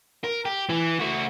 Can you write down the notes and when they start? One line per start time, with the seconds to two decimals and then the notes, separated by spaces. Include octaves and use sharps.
0.24 A#4
0.45 G4
0.69 E3
0.99 A3 F#4